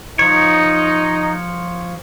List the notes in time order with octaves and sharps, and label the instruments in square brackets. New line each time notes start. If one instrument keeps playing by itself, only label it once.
[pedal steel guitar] F3 C#5 [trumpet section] D#4